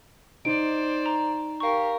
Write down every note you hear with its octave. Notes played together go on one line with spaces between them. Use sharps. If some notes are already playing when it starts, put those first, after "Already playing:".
D#4 C5 D5 D7
A#5
G4 A#4 F5 C#6